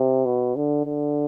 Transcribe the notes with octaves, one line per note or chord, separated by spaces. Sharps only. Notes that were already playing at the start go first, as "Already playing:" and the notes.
Already playing: C3
B2
D3
D3